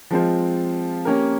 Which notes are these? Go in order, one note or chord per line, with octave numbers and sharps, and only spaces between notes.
F3 G#3 C4 F4 C5
A#3 C#4 G4 A#4